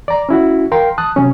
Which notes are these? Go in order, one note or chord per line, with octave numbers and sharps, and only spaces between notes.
D5 A#5
C#4 E4 F#4
A#4 F5 G5 C6
A5 D#6 F#6
C3 F#3 C#4